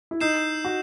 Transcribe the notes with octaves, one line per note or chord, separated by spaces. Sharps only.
E4
D#4 E6 G6 C7 E7
F#4